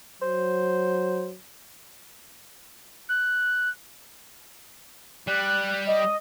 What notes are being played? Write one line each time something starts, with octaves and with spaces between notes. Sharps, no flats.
F#3 C5
F#6
G3 F#6
D#5